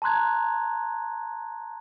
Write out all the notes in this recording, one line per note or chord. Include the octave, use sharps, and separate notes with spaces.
A5 A#5 C6 F#6 G#6